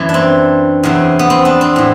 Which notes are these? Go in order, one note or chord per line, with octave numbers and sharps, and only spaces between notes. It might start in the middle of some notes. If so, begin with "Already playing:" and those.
Already playing: F#2 E3
D4
C4
E2 C3 F#3
B3
C4
B3 D4
C4
A2 E3